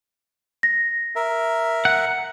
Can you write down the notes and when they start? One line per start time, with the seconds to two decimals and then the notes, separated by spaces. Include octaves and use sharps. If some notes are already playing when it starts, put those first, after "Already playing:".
0.63 A#6
1.16 A#4 E5
1.85 F#5